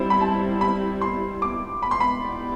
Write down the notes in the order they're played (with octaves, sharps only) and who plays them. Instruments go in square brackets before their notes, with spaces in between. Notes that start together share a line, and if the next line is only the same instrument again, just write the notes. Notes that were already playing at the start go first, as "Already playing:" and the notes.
Already playing: [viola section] G3 C4 E4 [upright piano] C5 B5
[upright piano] B5
A5
B5
C6
D6
B5
C6
B5
[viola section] B3 E4 G4 D5